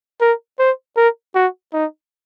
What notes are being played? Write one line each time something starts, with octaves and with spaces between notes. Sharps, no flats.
A#4
C5
A#4
F#4
D#4